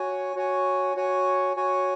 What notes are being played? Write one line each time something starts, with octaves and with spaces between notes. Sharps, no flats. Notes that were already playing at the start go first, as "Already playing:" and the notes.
Already playing: F#4 C#5 G#5
F#4 C#5 G#5
F#4 C#5 G#5
F#4 C#5 G#5